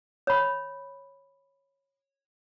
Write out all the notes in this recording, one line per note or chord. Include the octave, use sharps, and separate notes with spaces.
C#5 B5